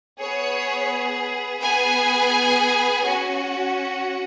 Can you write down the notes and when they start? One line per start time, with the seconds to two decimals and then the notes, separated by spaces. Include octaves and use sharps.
0.18 B3 G#4 C#5
1.61 B3 G#4 G#5
3.04 C#4 F#4